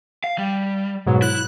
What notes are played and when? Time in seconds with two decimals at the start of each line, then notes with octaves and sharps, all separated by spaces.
0.24 F5
0.38 G3
1.06 G#2 B2 F#3
1.22 E4 F#6